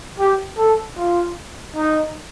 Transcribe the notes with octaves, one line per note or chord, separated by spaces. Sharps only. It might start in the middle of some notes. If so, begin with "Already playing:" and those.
G4
A4
F4
D#4